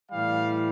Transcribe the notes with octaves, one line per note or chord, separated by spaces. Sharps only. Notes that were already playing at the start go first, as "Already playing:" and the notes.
A2 E3 G3 F5